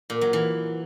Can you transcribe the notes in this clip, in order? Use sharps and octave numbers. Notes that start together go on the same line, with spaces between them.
A#2
F#3
E3